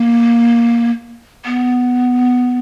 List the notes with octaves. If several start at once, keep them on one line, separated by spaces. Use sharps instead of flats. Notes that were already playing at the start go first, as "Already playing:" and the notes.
Already playing: A#3
B3